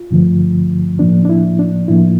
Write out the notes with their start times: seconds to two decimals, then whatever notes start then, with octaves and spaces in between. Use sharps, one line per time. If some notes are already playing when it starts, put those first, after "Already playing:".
Already playing: F4
0.11 G2 D3 F3 A3
0.99 A2 F3 A#3 D4
1.25 D4
1.29 E4
1.59 D4
1.88 A2 F3 A#3 E4